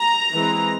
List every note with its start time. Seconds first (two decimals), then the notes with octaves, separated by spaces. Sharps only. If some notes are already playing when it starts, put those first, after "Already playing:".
Already playing: A#5
0.33 E3 G#3 C4